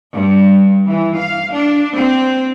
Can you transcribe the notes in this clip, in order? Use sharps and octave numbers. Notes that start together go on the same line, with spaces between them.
G2
E3
F5
D4
C4